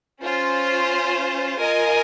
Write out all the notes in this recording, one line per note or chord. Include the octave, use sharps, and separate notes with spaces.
C#4 F4 C5
F4 A#4 D#5 G#5